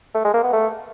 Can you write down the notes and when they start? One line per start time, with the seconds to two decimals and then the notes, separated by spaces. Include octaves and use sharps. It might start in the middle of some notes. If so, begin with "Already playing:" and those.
0.15 A3
0.24 G#3
0.34 A#3
0.44 B3
0.53 A3